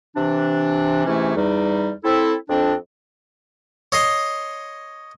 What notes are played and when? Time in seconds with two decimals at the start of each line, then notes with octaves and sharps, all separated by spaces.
0.15 C3 E3 D4
1.06 G#2 C3 E3 A3 C#4 E4
1.36 E2 G3 D#4
2.04 C4 E4 A4
2.49 F2 C4 D4
3.92 C#5 D#5 C6